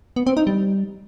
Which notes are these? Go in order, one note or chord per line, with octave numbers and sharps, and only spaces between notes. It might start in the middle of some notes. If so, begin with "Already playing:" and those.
B3
C4
D#4
G3